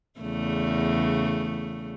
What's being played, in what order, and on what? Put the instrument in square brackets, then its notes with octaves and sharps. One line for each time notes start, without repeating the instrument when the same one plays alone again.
[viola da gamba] E2 C#3 A3